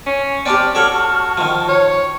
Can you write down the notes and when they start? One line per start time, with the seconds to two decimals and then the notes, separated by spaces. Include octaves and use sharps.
0.06 C#4
0.46 C4 D4 G4 D5 A5 C#6 F6
0.75 F#4 A4 C#5 F#5
1.37 D#3 F3
1.69 C#5